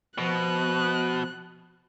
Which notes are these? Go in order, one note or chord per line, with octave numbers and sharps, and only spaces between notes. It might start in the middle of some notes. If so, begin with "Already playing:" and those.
B2 F3 F#6